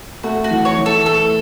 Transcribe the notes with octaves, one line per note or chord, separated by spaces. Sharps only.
A3 F#4
F#4
E3
C#5
E3
A4
A3 A4